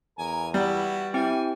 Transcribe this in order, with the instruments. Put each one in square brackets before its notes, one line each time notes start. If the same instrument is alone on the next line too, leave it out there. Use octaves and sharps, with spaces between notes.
[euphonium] E2 [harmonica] A#4 G#5
[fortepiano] G3 [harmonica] B3 E4 F#4
[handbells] C4 G4 G5 [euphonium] E4 [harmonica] G#5